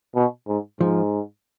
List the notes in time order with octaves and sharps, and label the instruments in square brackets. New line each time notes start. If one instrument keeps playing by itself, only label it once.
[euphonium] B2
G#2
[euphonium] G#2 [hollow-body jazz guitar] F3